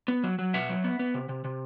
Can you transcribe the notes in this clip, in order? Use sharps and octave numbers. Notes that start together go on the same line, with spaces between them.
B3
F#3
F#3
B2 E5 F#5
F#3
B3
B3
C3
C3
C3